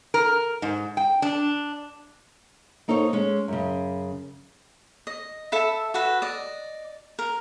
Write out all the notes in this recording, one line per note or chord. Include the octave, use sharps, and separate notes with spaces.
A#4
G#2
G5
D4
A#3 D#4 A4 C5 C#5
G#3 C#4
F#2 C#3
D#5
A4 E5 B5
F#4 A4 B4
D5 D#5
A#4